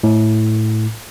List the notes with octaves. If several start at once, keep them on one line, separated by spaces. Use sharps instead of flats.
A2